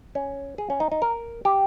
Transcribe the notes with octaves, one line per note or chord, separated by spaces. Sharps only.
C#4
G#4
C#4
D#4
D#4
A#4
G4